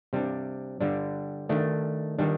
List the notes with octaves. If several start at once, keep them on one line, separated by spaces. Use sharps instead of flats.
C3 G3 D4
D3 G3 D4
D#3 A3 D4
D#3 G3 D4